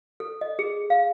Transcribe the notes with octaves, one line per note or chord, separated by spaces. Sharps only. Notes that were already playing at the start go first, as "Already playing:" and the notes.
A4
D#5
G#4
F5